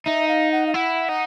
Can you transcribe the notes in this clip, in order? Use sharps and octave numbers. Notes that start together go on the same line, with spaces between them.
D#4 E5
F5
F#5
F5
E4 F#5
D#4